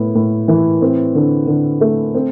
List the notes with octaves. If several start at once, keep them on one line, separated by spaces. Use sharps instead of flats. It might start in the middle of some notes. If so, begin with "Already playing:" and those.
Already playing: A2 B3
A2
E3
C4
D3
D3
A3
C4